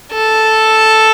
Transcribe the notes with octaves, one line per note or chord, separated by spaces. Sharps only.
A4